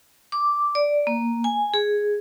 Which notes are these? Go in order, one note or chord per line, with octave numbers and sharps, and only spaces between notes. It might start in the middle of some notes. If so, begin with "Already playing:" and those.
D6
D5
A#3
G#5
G#4